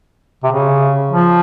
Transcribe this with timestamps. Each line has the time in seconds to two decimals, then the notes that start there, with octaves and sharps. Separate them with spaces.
0.43 C3
0.52 C#3
1.12 F3